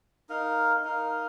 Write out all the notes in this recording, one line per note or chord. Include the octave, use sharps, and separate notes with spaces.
D#4 A#4 F5
D#4 A#4 F5